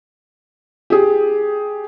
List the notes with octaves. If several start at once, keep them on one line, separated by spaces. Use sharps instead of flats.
G4 G#4